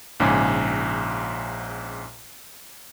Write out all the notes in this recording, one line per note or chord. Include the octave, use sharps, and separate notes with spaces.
A#1 G#2 C#3 G#5 D6